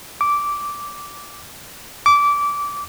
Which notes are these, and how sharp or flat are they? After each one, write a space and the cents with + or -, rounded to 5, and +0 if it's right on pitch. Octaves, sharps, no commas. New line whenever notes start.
D6 -10
D6 -20